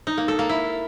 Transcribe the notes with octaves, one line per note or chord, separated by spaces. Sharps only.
D#4
A#3
A4
A#3
E4